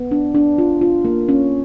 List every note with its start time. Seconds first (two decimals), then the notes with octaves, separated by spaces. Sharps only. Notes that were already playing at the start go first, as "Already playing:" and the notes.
Already playing: B3
0.11 D4
0.35 D4
0.58 F4
0.81 F4
1.05 A#3
1.29 C#4